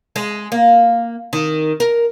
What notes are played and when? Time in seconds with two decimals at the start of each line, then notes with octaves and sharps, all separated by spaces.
0.16 G#3
0.52 A#3
1.33 D#3
1.80 A#4